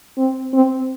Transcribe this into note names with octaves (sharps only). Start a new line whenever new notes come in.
C4
C4